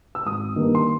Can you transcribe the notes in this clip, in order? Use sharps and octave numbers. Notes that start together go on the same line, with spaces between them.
E6
G#1 D#6
G2 D#3 G3 A#3
C6